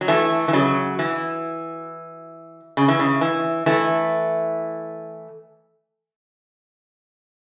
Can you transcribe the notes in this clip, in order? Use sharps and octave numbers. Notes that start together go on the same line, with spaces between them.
F#3
E3 A3
E3
C#3 F#3
E3
C#3
E3
C#3
E3
E3 A3